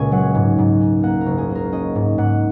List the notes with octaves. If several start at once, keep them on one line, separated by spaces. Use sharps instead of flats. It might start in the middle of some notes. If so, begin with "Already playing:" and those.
Already playing: C#2 A#2 C#4 G#5
F#3 F#5
G#2
G#2
C#4
A#3 F#5
A#4
F#1
G#4
A#3
A#4
C#4 D#5
G#2
G#2 F#5